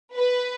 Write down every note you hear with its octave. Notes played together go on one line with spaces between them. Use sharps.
B4